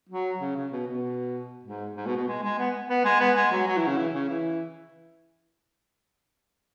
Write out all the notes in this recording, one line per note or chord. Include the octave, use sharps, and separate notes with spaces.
F#3
C#3
C#3
B2
B2
G#2
G#2
B2
B2
G#3
G#3
B3
B3
G#3
B3
G#3
F#3
F#3
E3
C#3
E3
C#3
E3